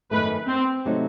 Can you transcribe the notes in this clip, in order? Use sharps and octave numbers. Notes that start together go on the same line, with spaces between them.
F#2 D#3 A3 B4
C4
C3 F#3 A3 D#4